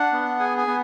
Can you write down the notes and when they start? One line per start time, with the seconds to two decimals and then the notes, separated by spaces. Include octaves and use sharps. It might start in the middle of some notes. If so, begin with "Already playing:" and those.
Already playing: D4 F#5
0.13 B3
0.39 G#4 G#5
0.57 G#5
0.67 B3